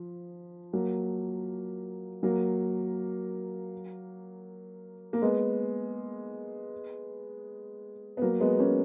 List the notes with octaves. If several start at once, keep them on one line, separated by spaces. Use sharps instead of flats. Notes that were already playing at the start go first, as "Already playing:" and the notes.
Already playing: F3
F#3 A#3
F#3 A#3
A#3
G#3 B3
B3
F#3 A#3
G#3 B3
A#3 C#4